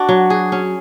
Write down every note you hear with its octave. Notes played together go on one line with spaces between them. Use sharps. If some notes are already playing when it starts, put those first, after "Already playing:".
Already playing: D4 F#4
F#3
G#4
C#4